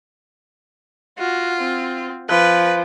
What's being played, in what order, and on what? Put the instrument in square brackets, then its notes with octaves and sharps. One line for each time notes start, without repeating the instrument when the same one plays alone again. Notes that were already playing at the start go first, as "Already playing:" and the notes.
[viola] F4 [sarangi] F#4
[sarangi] C4
[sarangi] F3 [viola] B4